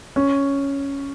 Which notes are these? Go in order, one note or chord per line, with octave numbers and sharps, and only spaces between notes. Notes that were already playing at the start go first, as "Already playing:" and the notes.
C#4